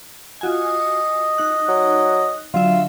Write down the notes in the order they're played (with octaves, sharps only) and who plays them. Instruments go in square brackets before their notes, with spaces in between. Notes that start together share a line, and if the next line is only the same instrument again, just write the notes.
[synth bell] F4 F#4 G#5 [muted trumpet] D#5
[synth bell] D#4 F#6
[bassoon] F#3
[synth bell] D3 F#3 E5 [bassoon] F4